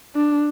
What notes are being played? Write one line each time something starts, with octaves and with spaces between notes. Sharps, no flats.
D4